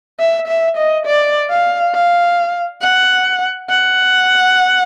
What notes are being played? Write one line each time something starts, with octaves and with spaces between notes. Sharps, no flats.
E5
E5
D#5
D5
F5
F5
F#5
F#5